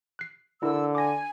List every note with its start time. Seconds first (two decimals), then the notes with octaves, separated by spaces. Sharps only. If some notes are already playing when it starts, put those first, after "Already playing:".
0.19 F#6 C7
0.63 D3 E4 A#4 E6
0.95 G#5 D6 A#6